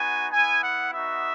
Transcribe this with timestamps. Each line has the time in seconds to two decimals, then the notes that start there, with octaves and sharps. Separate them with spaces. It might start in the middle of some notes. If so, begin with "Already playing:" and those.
Already playing: B3 D#4 F#4 G#5
0.31 B3 E4 G#5
0.62 F#5
0.91 B3 D#4 F#4 E5